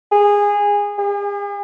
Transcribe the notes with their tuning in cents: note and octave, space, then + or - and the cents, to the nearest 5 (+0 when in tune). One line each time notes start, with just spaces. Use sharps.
G#4 -20
G#4 -45